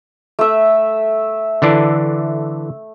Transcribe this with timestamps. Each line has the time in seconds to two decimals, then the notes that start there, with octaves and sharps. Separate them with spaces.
0.39 A3 E5
1.62 D3 E3 D4